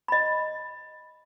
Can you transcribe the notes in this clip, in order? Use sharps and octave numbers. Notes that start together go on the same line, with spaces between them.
D#5 B5